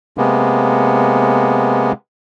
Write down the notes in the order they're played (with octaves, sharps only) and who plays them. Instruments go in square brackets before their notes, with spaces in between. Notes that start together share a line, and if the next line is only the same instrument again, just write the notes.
[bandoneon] C3 G#3 A#3 B3